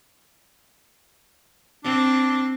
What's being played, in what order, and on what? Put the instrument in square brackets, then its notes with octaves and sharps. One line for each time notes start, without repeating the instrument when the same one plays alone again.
[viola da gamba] C4 [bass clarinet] D4